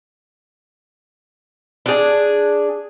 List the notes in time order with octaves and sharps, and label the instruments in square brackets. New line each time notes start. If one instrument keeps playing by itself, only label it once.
[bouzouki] D4 G#4